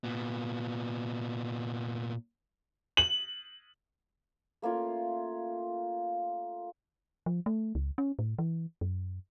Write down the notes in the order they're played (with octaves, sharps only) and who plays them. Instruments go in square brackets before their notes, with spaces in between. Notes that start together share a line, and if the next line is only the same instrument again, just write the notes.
[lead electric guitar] A#2 B3
[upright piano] F#7
[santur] A3 A#3 C#4 F4
[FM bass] F3
A3
C#2
C#4
A2
E3
F#2